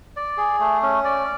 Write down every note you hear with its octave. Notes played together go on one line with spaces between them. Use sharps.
D5
G#4
A3
C#4
D5